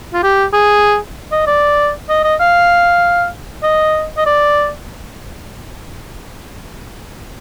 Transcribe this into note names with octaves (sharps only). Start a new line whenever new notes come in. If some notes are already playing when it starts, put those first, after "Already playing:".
F4
G4
G#4
D#5
D5
D#5
D#5
F5
D#5
D#5
D5